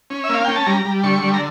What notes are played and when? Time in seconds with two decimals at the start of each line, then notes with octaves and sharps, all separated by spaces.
0.10 C#4
0.24 E5
0.29 A#3 F5
0.45 C#4 G5
0.56 A5
0.66 G3 A#5
0.85 G3
1.04 D3 C#6
1.23 G3
1.34 A#5